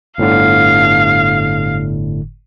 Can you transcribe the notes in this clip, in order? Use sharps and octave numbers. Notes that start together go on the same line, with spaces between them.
G1 A2 D3 F5